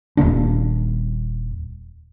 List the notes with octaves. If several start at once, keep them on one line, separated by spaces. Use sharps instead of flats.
D#1 G#2 A#3 D4